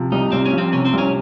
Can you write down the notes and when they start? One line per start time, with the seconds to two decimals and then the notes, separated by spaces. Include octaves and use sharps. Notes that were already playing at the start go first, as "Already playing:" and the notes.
Already playing: C3 F3
0.12 C2 D#4
0.32 C2 C4
0.46 C#4
0.53 F3
0.58 C4
0.73 C3 C#4
0.85 C4
0.93 C2
0.98 C#4